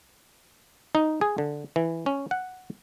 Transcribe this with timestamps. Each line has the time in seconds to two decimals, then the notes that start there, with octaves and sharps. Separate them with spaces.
0.95 D#4
1.21 G#4
1.38 D3
1.76 E3
2.06 C#4
2.31 F#5